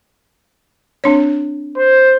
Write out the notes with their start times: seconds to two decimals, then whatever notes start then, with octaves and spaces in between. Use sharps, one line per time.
1.04 C4 D4 C#5
1.77 C5